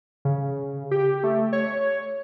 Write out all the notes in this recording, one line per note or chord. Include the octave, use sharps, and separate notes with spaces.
C#3
G4
A3
C#5